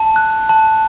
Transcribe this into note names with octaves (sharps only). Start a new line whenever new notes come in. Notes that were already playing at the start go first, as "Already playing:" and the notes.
Already playing: A5
F#6
A5